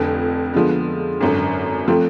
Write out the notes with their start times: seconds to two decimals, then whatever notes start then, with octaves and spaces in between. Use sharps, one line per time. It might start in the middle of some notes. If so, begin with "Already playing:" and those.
Already playing: F1 F2 D3
0.54 D3 F3 G#3 B3
1.21 G#1 F#2 D3
1.88 F3 A3 C4